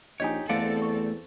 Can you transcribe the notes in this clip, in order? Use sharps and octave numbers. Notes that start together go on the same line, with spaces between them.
A#1 D#4 G4 C#5 D#5 G#5
E2 A3 C4 A4 D5 F5 F#5
C#6